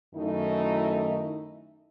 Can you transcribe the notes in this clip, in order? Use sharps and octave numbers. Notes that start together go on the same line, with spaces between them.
F#2 D#3 A3 D#4 E4